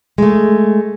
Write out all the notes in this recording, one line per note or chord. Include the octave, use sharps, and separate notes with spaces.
G#3 A3